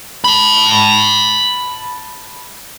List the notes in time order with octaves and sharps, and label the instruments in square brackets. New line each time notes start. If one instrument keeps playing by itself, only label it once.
[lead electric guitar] A5 B5